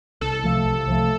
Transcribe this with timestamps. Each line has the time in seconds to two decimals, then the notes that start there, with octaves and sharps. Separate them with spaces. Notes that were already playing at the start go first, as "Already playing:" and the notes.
0.21 C2 A4
0.44 C3 F3 A3
0.65 C2
0.87 C3 F3 A3